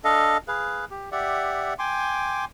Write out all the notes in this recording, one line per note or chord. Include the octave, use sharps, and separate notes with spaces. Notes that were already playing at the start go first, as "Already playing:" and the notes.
D4 A4 D#5 F5
G#4 B4 F5
G4
G4 D5 E5 F#5
G5 G#5 C6 D6